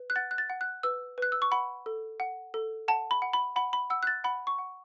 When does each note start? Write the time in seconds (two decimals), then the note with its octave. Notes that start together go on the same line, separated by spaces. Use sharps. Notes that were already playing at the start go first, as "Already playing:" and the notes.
Already playing: B4
0.10 F#6
0.16 F#5 A6
0.31 F#6
0.38 A6
0.50 F#5
0.61 F#6
0.83 B4 E6
1.18 B4 F#6
1.32 E6
1.42 C#6
1.51 F#5 B5
1.86 A4
2.20 F#5
2.54 A4
2.88 F#5 A5
3.11 B5
3.22 F#5
3.33 B5
3.56 F#5 B5
3.73 B5
3.90 F#5 E6
4.03 F#6
4.07 A6
4.24 F#5 B5
4.47 C#6
4.58 F#5